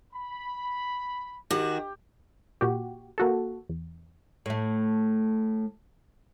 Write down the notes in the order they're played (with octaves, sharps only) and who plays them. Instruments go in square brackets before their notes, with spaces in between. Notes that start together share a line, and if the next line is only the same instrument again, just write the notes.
[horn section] B5
[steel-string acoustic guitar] D#3 F#4 [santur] G4
[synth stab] A#2 F#4 G4
A#3 F#4 A4
E2
[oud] A2 A3